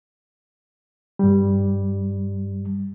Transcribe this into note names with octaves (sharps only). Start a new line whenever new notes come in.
G2 G3